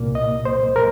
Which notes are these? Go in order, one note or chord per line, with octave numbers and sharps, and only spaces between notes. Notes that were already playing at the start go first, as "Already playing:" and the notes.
Already playing: C2 A#2 A#3
D#5
C5
A#4